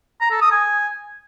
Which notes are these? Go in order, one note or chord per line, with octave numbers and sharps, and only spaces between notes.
A#5
A4
D#6
G#5